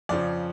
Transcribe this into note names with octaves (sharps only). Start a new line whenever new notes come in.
F2 C#3 F3 D5